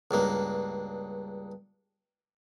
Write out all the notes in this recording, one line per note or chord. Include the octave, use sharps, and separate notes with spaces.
C#2 G2 A#3